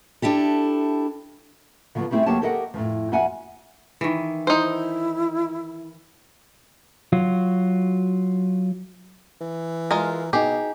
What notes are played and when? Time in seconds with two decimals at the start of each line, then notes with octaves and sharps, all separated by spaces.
0.22 D4 E4 G4 A4
1.95 D3 F3 F#3 B3
2.11 G3 A3 C4 E4 G#4
2.26 D2 F#3 A#3 G4 C#5 A5
2.42 G4 A4 A#4 D#5 F5 F#5
2.74 F2 A2 F3
3.12 F2 F#4 E5 F#5 G#5
4.01 D#3 E3
4.47 D#4 E4 C5
7.13 F#3 F4 F#4
9.41 E3
9.91 G#3 F4 A#4
10.33 B2 D#4 G4 G#4